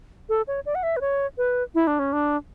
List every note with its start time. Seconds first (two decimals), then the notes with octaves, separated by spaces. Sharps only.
0.29 A4
0.47 C#5
0.66 D5
0.75 F#5
0.83 E5
0.96 B4
1.01 C#5
1.38 B4
1.75 E4
1.87 D4
1.99 C#4
2.13 D4